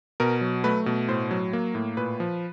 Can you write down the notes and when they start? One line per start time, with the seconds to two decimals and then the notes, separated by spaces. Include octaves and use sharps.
0.20 B2 A#4
0.41 F#3
0.64 A3 B4
0.86 B2
1.08 A2 C5
1.31 F#3
1.53 A#3
1.75 A2
1.97 A#2 B4
2.20 F3